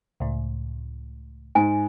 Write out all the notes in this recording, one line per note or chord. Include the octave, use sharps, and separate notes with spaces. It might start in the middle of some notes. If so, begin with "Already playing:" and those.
C#2 A2
G#2 G#5